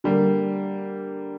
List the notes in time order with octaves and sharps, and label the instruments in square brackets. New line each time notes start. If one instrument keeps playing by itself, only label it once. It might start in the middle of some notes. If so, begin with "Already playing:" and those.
[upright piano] D3 G3 A#3